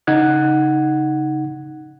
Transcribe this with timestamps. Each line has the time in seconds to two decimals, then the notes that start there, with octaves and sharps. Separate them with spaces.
0.07 C#3 D#4 F#5 F#6 G#6